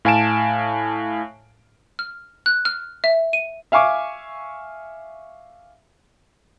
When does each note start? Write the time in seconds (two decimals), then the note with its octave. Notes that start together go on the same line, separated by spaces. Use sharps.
0.05 A2 F5 G#5 A5 D7 E7
1.99 F6
2.46 F#6
2.65 F6
3.04 E5
3.33 D#7
3.72 E5 F5 G#5 C#6 D6